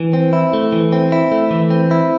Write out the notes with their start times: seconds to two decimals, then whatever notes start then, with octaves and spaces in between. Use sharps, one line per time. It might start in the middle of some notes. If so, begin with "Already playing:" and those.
Already playing: E3
0.13 C4
0.33 E4
0.53 A3
0.72 E3
0.92 C4
1.12 E4
1.31 A3
1.51 E3
1.70 C4
1.91 E4